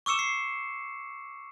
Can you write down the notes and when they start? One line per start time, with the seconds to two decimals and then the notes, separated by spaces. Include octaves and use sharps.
0.06 C#6 D6 E6 C#7 E7
0.19 C7